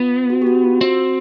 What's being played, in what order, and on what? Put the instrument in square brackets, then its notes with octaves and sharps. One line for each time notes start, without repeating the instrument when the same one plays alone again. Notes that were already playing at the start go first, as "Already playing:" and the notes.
Already playing: [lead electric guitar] B3 [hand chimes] F4
[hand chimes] F#4
G4
F#4
F4
[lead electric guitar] C4 [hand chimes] F#4